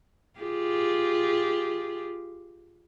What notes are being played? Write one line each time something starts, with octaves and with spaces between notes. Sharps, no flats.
F4 G4 G#4